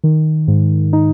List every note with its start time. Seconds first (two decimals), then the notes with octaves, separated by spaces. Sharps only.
0.04 D#3
0.48 G#2
0.93 D#4